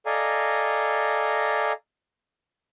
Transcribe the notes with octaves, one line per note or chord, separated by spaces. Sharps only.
A4 D5 D#5 F5 G#5 A#5